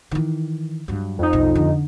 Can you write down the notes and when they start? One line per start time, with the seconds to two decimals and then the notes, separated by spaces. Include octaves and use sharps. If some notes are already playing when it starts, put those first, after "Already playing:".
0.11 D#3 E3
0.88 G2 F#3
1.19 F2 D#4
1.33 B1 C4
1.55 D3